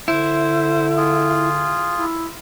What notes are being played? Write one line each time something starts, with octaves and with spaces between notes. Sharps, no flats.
D3 E4 C5
F4 G#4
E4